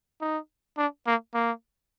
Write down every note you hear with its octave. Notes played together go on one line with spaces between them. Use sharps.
D#4
D4
A#3
A#3